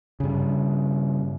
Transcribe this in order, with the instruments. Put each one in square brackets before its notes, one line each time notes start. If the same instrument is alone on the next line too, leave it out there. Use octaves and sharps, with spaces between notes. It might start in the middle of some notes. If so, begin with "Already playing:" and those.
[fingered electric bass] G2 C#3